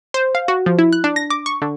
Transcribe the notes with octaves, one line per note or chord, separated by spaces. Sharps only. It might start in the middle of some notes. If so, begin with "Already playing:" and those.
C5
F5
F#4
F3
E4
F#6
D4
A#6
D6
C#6
D3